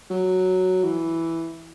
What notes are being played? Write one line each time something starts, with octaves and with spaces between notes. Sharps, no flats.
F#3
E3